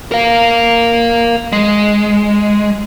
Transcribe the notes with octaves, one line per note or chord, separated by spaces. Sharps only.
A#4 F5
G#3